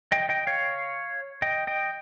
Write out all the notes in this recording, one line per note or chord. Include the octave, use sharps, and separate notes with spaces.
D#5 G5
D#5 G5
C#5 F5
D#5 G5
D#5 G5